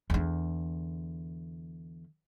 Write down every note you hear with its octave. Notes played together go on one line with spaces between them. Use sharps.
E2 D3